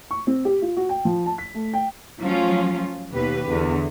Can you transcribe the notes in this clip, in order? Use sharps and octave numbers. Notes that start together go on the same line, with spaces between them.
C#6
C4
G4
F4
F#4
G5
F3
A5
B6
A3
G5
F3 F#3 A3 C#4 F4
D#2 B2 G4 B4
E2 D3